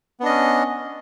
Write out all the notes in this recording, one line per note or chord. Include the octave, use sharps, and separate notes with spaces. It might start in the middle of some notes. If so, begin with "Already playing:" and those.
B3 C#4 D4 D#5